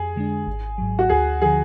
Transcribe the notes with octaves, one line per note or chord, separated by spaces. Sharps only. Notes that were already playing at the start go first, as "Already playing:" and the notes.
Already playing: F2 G#4
D3 G#3 D4
G#1
G#2 F#3
F#4
D2 G#4
D3 F3 G#4